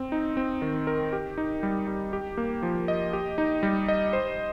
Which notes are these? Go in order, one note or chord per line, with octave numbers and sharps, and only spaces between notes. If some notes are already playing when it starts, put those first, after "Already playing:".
Already playing: C4
D#4
C4
D#3
A#4
G4
D#4
G3
G3
G4
A#3
F3
D#5
G4
D#4
G3
D#5
C5